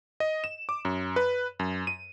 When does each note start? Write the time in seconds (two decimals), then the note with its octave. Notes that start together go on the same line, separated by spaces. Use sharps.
0.20 D#5
0.44 E7
0.69 D6
0.85 F#2
1.16 B4
1.59 F#2
1.87 D#7